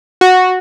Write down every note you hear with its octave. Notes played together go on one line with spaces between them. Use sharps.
F#4